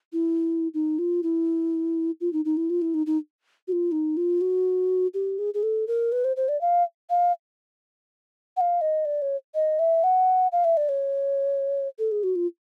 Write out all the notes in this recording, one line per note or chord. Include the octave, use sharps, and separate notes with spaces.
E4
D#4
F4
E4
F4
D#4
D#4
E4
F4
E4
D#4
D#4
F#4
F4
D#4
F4
F#4
G4
G#4
G#4
A4
A#4
B4
C5
C5
D5
F5
F5
F#5
F5
D#5
D5
C#5
D#5
E5
F#5
F5
E5
D5
C#5
A4
G#4
F#4
F4